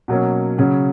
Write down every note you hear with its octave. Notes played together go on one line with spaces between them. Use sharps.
B2 F#3 A#3 C#4
C#3 F#3 C#4